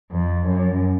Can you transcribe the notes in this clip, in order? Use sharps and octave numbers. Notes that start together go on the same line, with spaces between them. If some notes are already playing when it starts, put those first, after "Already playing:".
F2
F#2